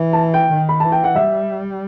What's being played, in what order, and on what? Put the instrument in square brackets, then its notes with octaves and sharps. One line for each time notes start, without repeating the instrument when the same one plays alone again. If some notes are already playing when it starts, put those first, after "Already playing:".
Already playing: [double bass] E3
[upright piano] A5
G5
[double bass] D#3
[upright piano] B5
[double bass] E3 [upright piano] A5
[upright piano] G5
F#5
[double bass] G3 [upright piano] E5